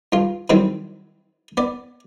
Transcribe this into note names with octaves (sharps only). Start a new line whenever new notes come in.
G2 F4
D#3 E3 F#3 G3 C4
B3 D5